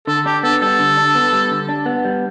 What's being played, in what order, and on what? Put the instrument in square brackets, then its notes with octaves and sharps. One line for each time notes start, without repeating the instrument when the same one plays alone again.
[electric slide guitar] D3 [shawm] A4
[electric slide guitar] D4 [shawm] G4
[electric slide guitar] B3 [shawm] A4
[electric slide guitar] G3 [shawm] A4
[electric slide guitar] D3
D4
B3
G3
D3
D4
B3
G3